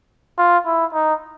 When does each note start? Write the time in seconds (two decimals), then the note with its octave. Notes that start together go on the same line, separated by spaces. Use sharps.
0.38 F4
0.66 E4
0.94 D#4